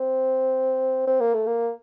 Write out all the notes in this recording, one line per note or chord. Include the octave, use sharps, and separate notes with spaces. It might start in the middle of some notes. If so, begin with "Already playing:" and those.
Already playing: C4
C4
A#3
A3
A#3